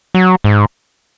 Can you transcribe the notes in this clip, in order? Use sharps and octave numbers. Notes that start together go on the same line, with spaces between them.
F#3
G#2